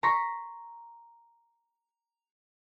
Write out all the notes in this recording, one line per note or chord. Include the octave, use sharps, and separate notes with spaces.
A#5 C6 C#6 A#6 B6